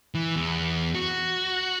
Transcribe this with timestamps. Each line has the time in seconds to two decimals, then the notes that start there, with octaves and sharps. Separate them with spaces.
0.15 E3
0.36 E2
0.95 F#4